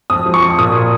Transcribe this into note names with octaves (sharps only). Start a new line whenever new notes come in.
F2 D#6
F3
C#6
F2
A#2 D#6
A#2